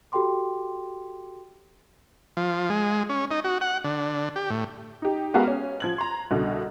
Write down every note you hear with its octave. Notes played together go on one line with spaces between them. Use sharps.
F#4 G4 A4 G5 C6 D6
F3
G#3
C#4
D#4
F#4
F#5
D3
G4
A2
D#4 G4
G#3 B3 F#4 G4 A#4 F5
C#4
F3 G#6 F#7
A#5 C6
C2 B2 D3